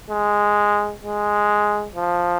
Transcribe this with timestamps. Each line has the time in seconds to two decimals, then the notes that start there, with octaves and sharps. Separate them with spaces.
0.10 G#3
1.04 G#3
1.96 F3